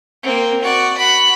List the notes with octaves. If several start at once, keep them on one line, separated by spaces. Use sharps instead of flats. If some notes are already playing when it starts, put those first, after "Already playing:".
A#3 C4
F#4 D5
F#4 B5